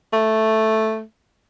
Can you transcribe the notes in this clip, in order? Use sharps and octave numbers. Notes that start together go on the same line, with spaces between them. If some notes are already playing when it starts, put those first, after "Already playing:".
A3